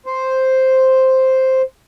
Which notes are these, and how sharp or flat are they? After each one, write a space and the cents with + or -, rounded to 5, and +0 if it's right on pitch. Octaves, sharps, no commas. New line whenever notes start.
C5 +0